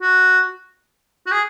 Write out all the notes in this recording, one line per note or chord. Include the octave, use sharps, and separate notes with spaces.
F#4
F#4
G#4